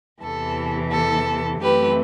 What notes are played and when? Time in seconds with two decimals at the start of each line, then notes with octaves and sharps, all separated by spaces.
0.21 E2 C3 E3 A4
0.92 A4
1.62 F#2 E3 A3 C4 G4 B4